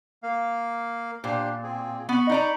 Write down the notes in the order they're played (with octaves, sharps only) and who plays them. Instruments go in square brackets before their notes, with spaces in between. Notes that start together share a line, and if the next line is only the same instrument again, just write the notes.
[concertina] A#3 F5
[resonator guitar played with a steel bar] A#2 [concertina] D4 G4 C5
[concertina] C4 G#4
[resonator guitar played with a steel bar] B3 [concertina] B5 C#6
[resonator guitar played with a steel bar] D#4 D5 A#5